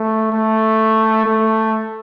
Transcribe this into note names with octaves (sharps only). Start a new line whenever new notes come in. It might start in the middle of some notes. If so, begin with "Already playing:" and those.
Already playing: A3
A3
A3